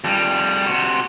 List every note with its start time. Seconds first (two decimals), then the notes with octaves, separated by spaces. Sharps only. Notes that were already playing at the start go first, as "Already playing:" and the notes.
0.04 F2 G3
0.67 C3 F#4